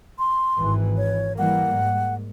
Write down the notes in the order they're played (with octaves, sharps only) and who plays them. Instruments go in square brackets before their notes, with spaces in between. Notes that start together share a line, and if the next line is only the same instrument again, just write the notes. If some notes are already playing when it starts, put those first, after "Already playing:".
[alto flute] C6
[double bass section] G#1 E3
[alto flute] C#5
[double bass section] E3 G3 A#3 [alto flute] F#5
[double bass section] G#2